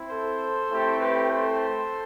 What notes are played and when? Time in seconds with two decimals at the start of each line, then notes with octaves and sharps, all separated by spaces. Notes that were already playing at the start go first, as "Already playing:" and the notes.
Already playing: C4 E4
0.10 A4 C5
0.71 A3 C4 E4 G4
1.00 G4 B4
1.30 A4 C5